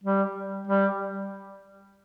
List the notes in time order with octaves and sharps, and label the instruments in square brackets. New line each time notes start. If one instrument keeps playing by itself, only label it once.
[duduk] G3
G3